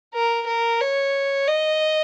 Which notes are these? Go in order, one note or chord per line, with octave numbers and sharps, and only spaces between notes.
A#4
A#4
C#5
D#5